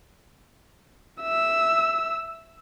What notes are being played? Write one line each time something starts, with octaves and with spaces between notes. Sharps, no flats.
E5 E6